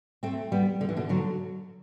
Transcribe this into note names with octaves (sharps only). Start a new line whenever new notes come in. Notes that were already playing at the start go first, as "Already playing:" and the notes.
A3 C4
G3 B3
D3
E3
B2 D3
D3 F#3